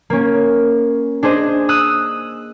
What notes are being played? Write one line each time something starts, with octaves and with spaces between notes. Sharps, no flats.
A#3 C#4
D4 G#4 C5 D#5
D#6 E6 F#6 D#7